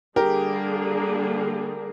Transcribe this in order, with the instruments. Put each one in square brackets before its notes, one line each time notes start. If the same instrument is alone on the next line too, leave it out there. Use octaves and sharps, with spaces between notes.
[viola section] D3 G3 A#3 D4 G#4 [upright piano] G4 A#4